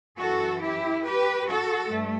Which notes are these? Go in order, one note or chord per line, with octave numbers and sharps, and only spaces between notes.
F#2 E3 F#4 A4
E4 G4
G4 B4
F#4 A4
G2 A3